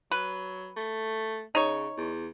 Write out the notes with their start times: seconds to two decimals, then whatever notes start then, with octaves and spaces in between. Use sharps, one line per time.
0.12 F#3 B4
0.77 A3
1.55 C#3 D#4 C#5
1.97 E2